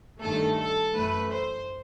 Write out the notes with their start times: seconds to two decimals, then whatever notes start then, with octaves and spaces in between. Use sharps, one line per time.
0.21 G2 D#3 A3 A4
0.58 A4
0.96 F#2 E3 A3 B4
1.32 C5